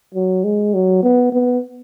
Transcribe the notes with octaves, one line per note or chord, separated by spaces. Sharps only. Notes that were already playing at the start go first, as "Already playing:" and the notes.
F#3
G#3
F#3
B3
B3